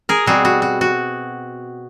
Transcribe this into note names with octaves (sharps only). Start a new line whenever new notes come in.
G#4 A#4
B2 G3 C4 F#4 G#4
F#4
F#4
F#4